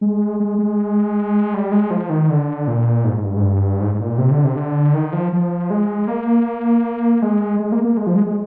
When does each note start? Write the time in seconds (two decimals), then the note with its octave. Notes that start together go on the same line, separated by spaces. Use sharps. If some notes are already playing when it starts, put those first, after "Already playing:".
0.01 G#3
0.40 G#3
0.59 G#3
1.54 G3
1.72 G#3
1.91 F3
2.10 D#3
2.30 D3
2.68 A#2
3.04 G#2
3.17 G#2
3.24 G2
3.37 G#2
3.42 G2
3.80 G#2
3.94 G#2
4.00 A#2
4.18 C3
4.31 D3
4.44 C3
4.56 D3
4.94 D#3
5.13 F3
5.33 F3
5.70 G#3
6.07 A#3
7.22 G#3
7.60 G#3
7.72 A#3
7.84 A#3
7.97 G#3
8.07 F3
8.16 G#3
8.26 G#3